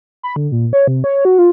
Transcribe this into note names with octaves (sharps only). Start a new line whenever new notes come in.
B5
D3
A#2
C#5
C3
C#5
F#4
F4